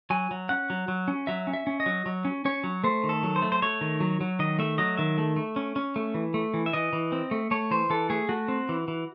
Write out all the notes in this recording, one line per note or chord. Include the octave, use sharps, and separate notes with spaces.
F#3 G#5
F#3
C#4 F#5
F#3
F#3
C#4
F#3 E5
C#4
E5
C#4
D#5
F#3
F#3
C#4
C#4 C#5
F#3
A3 C5
D#3
A4
F#3
C5
A3
C5
A3 C#5
D#3
F#3
F#3
D#3 D#5
A3 E5
F#3 D#5
D#3 E5
A3
A3
C#4
C#4
A3
E3
A3
E3
E5
E3 D#5
E3
C4
A3
A3 C#5
E3 C5
E3 A4
A3 G#4
A3 F#4
C4
E3
E3